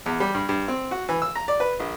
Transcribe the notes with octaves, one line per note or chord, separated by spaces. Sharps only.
E2
G3
G2
G2
C4
F#4
E3
E6
A#5
D5
B4
A#1